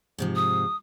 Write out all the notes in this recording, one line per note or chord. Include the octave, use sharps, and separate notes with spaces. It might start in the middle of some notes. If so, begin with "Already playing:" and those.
G#2 C3 F3
D#6